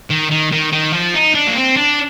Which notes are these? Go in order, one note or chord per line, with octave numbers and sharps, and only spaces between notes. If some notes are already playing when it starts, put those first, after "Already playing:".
D#3
D#3
D#3
D#3
F3
D#4
D4
A#3
C4
D4